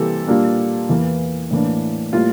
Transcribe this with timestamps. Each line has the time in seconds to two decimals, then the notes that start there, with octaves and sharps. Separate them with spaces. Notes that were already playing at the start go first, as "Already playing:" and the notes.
Already playing: C3 E3 G3 A#3 A4
0.28 A#2 G3 A#3 D4
0.89 E2 E3 A#3
1.51 A2 E3 A#3 D4
2.13 A2 G3 A#3 F4